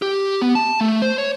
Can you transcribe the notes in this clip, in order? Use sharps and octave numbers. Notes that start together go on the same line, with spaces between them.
G4
B3
A5
A3
C5
C#5